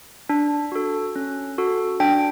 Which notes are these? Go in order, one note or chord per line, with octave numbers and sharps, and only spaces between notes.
D4
F#4 A4
C#4
F#4 A4
D4 G5